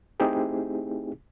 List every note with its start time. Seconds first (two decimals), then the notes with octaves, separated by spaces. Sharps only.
0.20 A3 C4 D#4 E4 G4 G#4